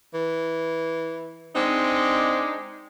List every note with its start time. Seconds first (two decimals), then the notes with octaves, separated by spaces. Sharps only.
0.14 E3
1.56 G#3 C4 D4 D#4